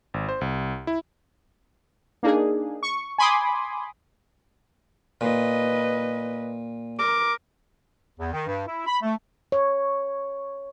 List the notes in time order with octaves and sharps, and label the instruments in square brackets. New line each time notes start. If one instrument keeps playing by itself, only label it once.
[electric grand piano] G#1
C5
C2
E4
[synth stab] A#3 D4 D#4 G#4
C#6
G#5 B5 C6 D6 D#6
[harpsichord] A#2 [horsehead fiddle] B4 D#5
[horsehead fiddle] A#4 [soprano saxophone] D6
[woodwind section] E2
D#3
G2
E4
B5
A3
[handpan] C#5